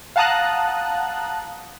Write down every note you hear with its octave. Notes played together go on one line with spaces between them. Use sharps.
F5 F#5 A5 A#5 D#6 F#6